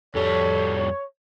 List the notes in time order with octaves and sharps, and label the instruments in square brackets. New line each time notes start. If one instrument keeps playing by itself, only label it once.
[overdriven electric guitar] F2 G3 [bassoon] A4 [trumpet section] C#5